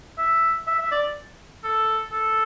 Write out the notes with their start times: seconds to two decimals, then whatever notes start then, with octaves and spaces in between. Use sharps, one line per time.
0.18 E5
0.67 E5
0.79 E5
0.91 D5
1.64 A4
2.12 A4